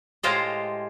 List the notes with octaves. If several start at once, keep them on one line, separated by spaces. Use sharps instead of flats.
A2 G#3 F4 G4 C5 D#5